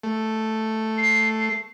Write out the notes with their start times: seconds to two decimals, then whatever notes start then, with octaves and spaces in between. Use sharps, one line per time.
0.03 A3
0.98 C7